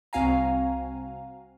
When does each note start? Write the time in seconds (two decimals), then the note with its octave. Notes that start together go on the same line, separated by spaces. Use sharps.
0.13 C2 C4 F#4 F5 G#5 A#5